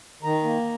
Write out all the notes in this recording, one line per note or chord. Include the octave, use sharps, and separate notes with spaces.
D#3 A#5
A#3